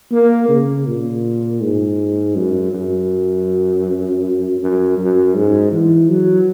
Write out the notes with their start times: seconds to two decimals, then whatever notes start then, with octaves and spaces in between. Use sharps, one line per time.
0.11 A#3
0.48 C#3
0.86 A#2
1.61 G#2
2.36 F#2
2.73 F#2
4.60 F#2
4.98 F#2
5.35 G#2
5.72 E3
6.10 F#3